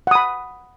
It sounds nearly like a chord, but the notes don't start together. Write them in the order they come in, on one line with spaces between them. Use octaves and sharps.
F#5 D#6 B5